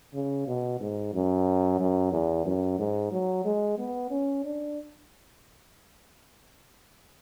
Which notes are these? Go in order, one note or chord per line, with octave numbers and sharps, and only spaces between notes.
C#3
B2
G#2
F#2
F#2
E2
F#2
G#2
F#3
G#3
B3
C#4
D4